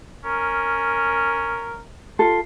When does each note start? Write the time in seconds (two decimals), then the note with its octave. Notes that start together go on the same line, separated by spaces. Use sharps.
0.24 C#4 A#4
2.19 F4 A4 C6